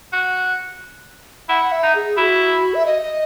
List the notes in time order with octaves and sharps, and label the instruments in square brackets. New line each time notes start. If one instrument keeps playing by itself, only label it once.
[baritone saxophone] F#4
[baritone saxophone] E4 [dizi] F#5
[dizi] E5
[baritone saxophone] D#4
[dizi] G#4
[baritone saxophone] E4 [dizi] F#4
[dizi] E5
D#5